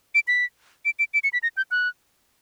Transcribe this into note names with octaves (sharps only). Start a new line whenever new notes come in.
D7
B6
D7
D7
D7
C#7
B6
A#6
G6
F#6